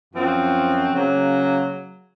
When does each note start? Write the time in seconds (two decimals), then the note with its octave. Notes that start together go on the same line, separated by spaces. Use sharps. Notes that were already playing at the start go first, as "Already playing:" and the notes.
0.14 F#2 F3 C4 F#4
0.92 C#3 F#3 A#3